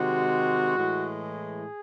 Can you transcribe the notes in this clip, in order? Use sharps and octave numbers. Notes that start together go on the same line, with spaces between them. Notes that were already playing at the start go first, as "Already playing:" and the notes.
Already playing: C3 D#3 G#3 F#4
A2 E3 G#3
G#4